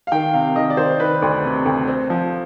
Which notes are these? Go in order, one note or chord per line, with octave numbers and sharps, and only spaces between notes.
F5
D#3 G5
C3 F5
D#3 D#5
D5
D#3 C5
D#3 B4
D2
C3
D2
C4
F3